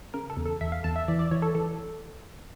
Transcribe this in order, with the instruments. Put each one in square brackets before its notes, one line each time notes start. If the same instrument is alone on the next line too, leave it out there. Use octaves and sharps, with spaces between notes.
[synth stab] C#3 A#4
A4
E2
A4
E2 E5
F5
E2 A5
E5
E3 D5
D5
E3 C#5
A4
E3 A4